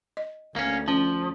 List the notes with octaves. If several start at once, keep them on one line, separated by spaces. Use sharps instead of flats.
D#5
D2 A#3 C#4
F3 C#4